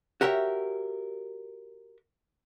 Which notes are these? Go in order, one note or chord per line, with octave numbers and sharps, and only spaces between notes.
F#4 G4 A#4 C#5 E5